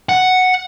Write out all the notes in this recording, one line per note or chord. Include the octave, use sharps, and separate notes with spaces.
F#5